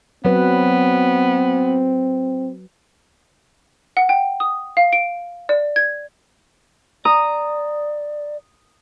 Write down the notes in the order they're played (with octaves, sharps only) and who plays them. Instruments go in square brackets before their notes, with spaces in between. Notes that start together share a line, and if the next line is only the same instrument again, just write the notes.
[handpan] F#3 B4 [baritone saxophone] B3 [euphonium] C4
[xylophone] F#5
G5
D#6
F5
D7
D5
G#6
[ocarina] D5 [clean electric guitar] A#5 [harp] D#6